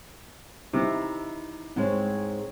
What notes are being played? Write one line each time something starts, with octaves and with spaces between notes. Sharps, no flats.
C3 D#4 E4
G#2 G#3 C4 G#4 C#5